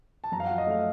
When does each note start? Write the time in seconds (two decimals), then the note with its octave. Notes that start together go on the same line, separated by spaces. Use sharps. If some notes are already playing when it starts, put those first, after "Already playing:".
0.24 A5
0.32 F#2 A#5
0.40 F5
0.46 F#5
0.50 F3
0.58 D#5
0.67 A3 F5